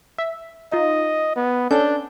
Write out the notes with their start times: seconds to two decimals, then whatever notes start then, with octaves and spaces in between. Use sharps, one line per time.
0.18 E5
0.72 D#4 F4 D#5
1.36 B3
1.71 C#4 D4 A4 G6